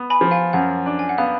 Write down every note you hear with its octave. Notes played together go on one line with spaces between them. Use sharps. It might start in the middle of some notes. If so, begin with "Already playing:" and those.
Already playing: B3
G#5 B5
F3
F5 G#5
F#2 F#5
D4
G#5
F#5
B3 F5